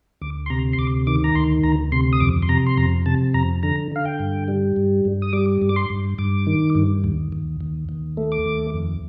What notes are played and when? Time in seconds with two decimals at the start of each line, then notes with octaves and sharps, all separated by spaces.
0.22 D2 D6
0.46 C6
0.50 C3 A#5
0.73 C6
0.79 D2 D6
1.07 D#3 D6
1.24 A#5
1.35 D2 C6
1.64 D2 A#5
1.92 C3 C6
2.13 D#6
2.20 F2 D6
2.42 C6
2.49 C3 A#5
2.66 C6
2.77 F2 A#5
3.06 C3 A5
3.34 F2 A#5
3.63 D3 A#5
3.92 D3 F5
4.05 G5
4.20 G2
4.48 G3
4.76 G2
5.05 G2
5.22 D#6
5.33 G3 D6
5.62 G2
5.69 D6
5.76 C6
5.90 G2
6.18 G2 D6
6.47 D#3
6.75 G2
7.04 D#2
7.32 D#2
7.61 D#2
7.89 D#2
8.17 A3
8.32 D6
8.46 D#2
8.74 F2